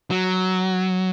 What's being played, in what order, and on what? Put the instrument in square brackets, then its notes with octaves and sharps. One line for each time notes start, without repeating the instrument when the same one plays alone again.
[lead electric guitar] F#3